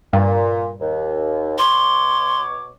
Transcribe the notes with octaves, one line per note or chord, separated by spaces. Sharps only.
G2 A#2
D#2
B2 C#5 C6 D6